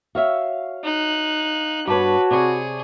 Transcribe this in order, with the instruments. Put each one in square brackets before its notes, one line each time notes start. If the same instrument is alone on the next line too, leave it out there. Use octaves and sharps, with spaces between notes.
[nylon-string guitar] F#4 C#5 E5 [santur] F5
[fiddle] D#4 F#6
[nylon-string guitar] G2 B3 [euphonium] F#4 [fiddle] B4 [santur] C#5 A5 D6
[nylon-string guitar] C3 [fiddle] G#4 [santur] D5 B5 C#6